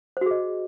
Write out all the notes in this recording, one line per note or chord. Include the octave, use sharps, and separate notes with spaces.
F#4 G#4 C5 D#5